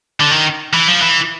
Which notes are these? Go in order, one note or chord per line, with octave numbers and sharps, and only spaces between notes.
D3
D#3
E3
F3
E3